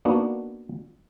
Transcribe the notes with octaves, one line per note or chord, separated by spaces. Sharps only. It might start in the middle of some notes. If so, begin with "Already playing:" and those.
A#3 B3 D4 D#4 F#4